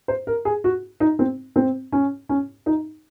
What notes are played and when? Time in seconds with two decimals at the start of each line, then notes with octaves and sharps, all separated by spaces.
0.08 C5
0.27 A#4
0.45 G#4
0.64 F#4
1.00 D#4
1.19 C4
1.56 C4
1.92 C#4
2.29 C#4
2.66 D#4